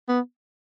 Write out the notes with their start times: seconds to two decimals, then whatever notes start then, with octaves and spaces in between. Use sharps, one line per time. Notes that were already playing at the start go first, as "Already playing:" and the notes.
0.08 B3